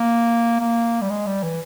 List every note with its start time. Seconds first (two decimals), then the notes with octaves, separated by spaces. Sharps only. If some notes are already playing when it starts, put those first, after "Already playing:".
Already playing: A#3
0.60 A#3
1.01 G3
1.09 G#3
1.26 G3
1.43 E3